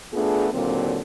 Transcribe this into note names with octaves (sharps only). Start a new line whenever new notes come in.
A3 B3 D4 F4 G#4
D#2 A#2 D3 F#3 C4